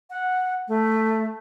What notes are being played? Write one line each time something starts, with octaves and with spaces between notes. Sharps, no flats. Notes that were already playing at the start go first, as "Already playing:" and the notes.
F#5
A3